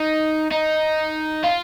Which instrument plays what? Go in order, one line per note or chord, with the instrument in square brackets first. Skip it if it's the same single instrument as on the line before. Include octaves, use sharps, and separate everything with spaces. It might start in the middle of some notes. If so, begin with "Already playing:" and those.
Already playing: [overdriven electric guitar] D#4
D#4
F4